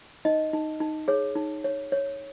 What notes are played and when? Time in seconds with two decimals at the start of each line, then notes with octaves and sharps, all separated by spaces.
0.25 D#4 D#5
0.53 D#4
0.80 D#4
1.08 G#4 C#5
1.35 D#4
1.64 C#5
1.92 C#5